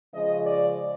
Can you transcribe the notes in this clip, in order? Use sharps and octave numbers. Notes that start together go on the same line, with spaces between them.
C#3 F3 G#3 D#5
D5